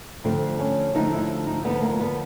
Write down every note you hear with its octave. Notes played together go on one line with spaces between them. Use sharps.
D2 D3 F3 A3 C4
C#4
D2 D3 F3 A3 D#4
E4
D#4
D2 D3 F3 A3 B3
A#3
B3